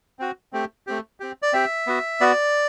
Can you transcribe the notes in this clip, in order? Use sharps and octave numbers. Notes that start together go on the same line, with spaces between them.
C4 F#4
A3 C4 G4
A3 C4 G4
C4 G4
D5
C4 G4 E5
B3 F#4
B3 F#4 D5